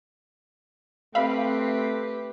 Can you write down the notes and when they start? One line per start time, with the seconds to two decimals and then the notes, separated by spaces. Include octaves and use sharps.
1.15 A3 C4 G4 B4 E5 F5 B5